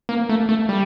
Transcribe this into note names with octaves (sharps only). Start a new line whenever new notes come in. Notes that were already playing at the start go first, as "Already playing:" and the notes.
A#3
A3
A3
G3